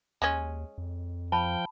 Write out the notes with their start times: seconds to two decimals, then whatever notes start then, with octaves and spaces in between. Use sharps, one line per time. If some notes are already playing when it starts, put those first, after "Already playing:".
0.22 D#2 G#3 C#4
0.78 F2
1.32 F3 G5 A5 B5